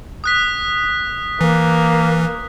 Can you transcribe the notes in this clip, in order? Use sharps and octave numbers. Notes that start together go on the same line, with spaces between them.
D#6 F#6 B6
E3 A#3